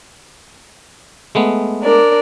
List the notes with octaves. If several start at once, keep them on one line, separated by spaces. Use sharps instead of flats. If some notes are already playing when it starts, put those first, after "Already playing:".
G#3 A3 B3
D4 A#4 D5